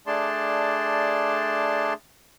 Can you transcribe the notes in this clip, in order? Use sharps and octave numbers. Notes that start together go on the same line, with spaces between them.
A3 D4 G#4 D5 A5 C6